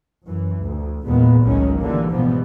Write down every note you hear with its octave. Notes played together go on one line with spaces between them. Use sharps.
F#2 E3
D2
E2 A#2 D#3 G#3 B3
G#1 C#2 A2 D#3 F#3 C#4
D3 E3 G3 A#3
G#2 B2 E3 F3 G3 B3